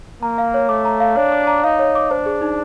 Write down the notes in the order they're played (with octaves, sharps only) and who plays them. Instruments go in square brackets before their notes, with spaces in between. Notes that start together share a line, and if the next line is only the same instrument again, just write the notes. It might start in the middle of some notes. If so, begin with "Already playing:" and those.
[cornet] A#3 [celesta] A#5
[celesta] F5
C#5
[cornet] A3 [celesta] D6
[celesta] A#5
F5
[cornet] D4 [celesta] C#5
[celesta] D6
A#5
[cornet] D#4 [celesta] F5
[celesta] C#5
D6
[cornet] D4 [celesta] C5
[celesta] G#4
D#4